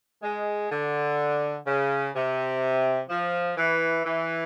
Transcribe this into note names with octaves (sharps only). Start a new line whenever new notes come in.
G#3
D3
C#3
C3
F3
E3
E3